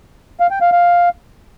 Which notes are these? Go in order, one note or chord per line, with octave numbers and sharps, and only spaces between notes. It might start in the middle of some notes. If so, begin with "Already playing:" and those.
F5
G5
F5
F5